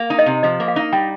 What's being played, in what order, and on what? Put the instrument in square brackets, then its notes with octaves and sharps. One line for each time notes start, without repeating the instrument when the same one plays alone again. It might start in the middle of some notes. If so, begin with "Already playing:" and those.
Already playing: [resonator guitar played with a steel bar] A#3
D#4
[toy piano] D#5
[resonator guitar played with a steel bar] C3
[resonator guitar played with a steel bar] F3 [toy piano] D#5
[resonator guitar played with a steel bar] A#3
[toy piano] F5
[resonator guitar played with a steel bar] D#4
[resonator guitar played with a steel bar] G3 [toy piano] G5